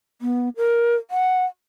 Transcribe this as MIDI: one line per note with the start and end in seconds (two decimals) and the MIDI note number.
0.22 0.49 59
0.57 0.95 70
1.11 1.45 78